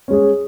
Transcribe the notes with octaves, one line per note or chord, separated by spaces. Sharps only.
G#3 C#4 G#4